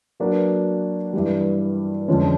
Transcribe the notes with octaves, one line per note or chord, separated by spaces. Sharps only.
F#3 A#3 D4 F#4 B4
G2 E3 G3
F2 D3 F3 G#3 C#4